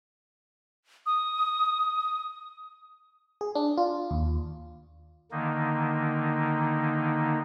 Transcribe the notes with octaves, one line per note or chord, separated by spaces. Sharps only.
D#6
G#4
D4
F4
D#2
D3 D#3 A#3 D#4